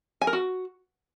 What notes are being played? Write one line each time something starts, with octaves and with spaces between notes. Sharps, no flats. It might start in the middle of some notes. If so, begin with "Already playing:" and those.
G#5
A#4
F#4